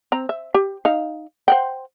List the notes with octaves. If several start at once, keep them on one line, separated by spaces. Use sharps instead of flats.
C4 A#5
E5
G4
D#4 F5
C5 F#5 G5